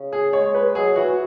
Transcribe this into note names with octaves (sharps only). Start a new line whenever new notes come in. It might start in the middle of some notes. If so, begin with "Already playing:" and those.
Already playing: C#3
G#4
G#3 C#5
B4
F#3 G#4
E3 F#4